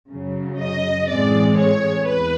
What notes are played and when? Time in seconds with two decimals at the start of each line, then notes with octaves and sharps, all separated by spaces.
0.11 F#2 C#3 F#3
0.60 D#5
1.09 A2 E3 G#3 C4 D5
1.57 C#5
2.06 E2 B4